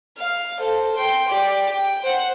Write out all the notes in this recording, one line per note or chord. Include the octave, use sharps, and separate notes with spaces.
F5
A4 C5
G5 C6
G4 D5
G5
C5 F#5